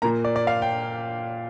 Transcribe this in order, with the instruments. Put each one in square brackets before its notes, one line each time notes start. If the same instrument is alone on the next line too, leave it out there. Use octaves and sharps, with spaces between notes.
[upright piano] A#2 A#3 A#5
D5
D5
F5
G5